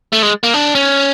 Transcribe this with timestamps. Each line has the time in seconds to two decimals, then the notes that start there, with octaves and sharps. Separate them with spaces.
0.13 A3
0.22 G#3
0.43 A#3
0.54 D4
0.75 C#4